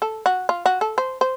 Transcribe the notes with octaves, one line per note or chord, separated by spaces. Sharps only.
A4
F#4
F4
F#4
A4
C5
C5